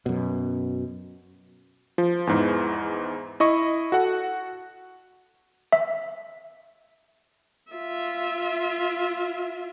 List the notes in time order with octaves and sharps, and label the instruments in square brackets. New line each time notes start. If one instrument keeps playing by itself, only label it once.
[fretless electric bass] F#2 B2
[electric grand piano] F3
E2 G#2 E3
E4 D#5 C#6
F#4 A4 F#5
[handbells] E5
[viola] F4 E5